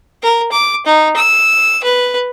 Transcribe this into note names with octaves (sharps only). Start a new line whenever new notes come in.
A#4
D6
D#4
E6
B4